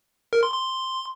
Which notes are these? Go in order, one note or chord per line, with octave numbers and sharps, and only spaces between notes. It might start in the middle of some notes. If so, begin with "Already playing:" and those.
A#4
C6
C6